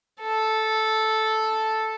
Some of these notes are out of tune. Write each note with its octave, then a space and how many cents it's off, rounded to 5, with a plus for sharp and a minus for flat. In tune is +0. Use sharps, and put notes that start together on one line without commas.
A4 -5